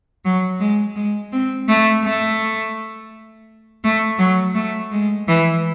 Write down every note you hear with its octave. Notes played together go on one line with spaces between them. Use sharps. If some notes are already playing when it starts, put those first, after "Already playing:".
F#3
G#3
G#3
C4
A3
A3
A3
F#3
A3
G#3
E3